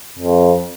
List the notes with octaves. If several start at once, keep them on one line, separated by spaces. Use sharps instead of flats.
F2